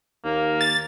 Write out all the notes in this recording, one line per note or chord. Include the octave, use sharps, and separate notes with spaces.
D#2 A#3
A6